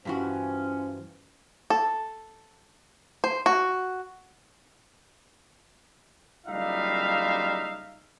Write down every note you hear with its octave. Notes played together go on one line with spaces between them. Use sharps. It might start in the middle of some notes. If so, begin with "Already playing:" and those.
G2 E3 F3 C#4 F#4
A4
C5
F#4
F#1 G3 D#4 F4 E5 F5